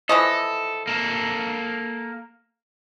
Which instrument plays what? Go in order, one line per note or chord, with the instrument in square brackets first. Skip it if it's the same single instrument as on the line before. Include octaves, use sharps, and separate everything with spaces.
[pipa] E3 F3 D#5 [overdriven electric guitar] A4
[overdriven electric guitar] A#3 A4